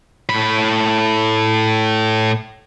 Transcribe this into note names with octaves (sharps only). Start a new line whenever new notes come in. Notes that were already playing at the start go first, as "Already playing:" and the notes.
A2 B5